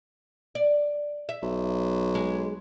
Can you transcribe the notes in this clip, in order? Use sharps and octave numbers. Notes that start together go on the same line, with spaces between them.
D5
E5
B1
G#3